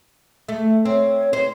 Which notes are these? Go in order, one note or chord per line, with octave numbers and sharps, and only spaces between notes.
A3
C4 C#5
C5